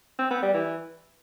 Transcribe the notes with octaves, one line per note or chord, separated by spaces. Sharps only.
C4
B3
G3
E3